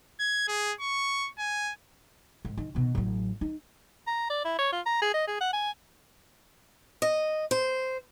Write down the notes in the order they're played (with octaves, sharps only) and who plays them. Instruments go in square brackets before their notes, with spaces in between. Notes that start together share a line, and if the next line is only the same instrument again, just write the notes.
[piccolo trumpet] G#6
G#4
C#6
G#5
[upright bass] G#2
D#3
B2 D#3
A1 F#3
D#4
[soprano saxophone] A#5
D5
E4
C#5
F4
A#5
G#4
D#5
G#4
F#5
G#5
[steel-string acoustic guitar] D#5
C5